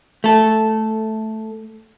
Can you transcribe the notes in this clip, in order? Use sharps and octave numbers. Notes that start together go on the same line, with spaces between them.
A3 A4